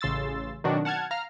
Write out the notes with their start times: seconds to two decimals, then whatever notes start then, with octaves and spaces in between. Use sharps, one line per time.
0.01 A1 C#3 C6 E6 A6
0.64 B2 D#3 F#3 C4 D4 F#4
0.85 F#5 A5 F6 G#6
1.11 F5 A#5 F6